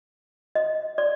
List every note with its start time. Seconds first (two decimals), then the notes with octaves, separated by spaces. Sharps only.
0.55 D#5
0.98 D5